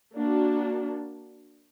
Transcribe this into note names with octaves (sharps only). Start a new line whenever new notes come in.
A#3 D4 F#4